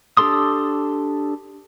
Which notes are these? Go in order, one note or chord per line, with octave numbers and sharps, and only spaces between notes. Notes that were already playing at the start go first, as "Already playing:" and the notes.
D4 G4 A4 C6 D#6